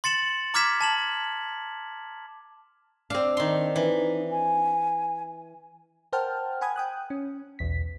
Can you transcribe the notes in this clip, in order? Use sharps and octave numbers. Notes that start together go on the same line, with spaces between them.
C6 A6 C#7 E7 F#7
A#5 D6 F6 G#6 B6 E7
A5 E7 F#7
C4 D4 F5
D#3 C6
E3 D#4
G#5
A#4 C5 F#5 G5 A5 F6
F#5 G#5 B5 D#6 G#6
G5 D#6 F#6
C#4
B1 E2 B6